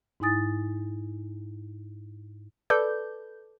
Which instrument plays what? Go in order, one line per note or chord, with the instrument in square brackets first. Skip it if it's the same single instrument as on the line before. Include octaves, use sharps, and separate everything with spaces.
[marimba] G#2 D#4 E4 G#5 D#6 A6
[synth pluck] A4 B4 D5 D6 G6